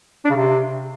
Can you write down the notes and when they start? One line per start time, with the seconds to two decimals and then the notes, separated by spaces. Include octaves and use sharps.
0.25 D4
0.30 C#3
0.36 C3